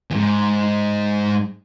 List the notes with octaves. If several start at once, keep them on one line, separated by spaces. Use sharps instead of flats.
E2 G#2